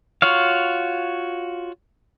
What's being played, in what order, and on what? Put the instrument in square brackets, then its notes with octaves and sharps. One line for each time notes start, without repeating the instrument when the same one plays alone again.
[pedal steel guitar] F4 F#4 C#5 F5